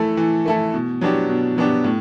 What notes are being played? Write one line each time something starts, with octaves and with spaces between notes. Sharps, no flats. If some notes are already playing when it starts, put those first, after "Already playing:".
Already playing: E3 A3 E4 A4
E3
A3 E4 A4
B2
F#3 B3 D4 G4
B2
F#3 B3 D4 G4
A2